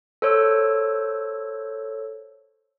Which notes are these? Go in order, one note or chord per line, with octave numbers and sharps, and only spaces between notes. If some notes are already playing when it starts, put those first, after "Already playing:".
A4 C5 C#5 E6